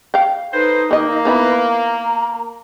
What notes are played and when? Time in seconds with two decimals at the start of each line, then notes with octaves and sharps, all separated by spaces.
0.14 F5 G5
0.53 D#4 A4 B4 C5
0.91 D#3 A#3 D#5
1.25 B3 D#4 E4 B4
1.69 A#5